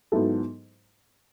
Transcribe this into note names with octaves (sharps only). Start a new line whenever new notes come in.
G#2 F#3 B3 E4 A4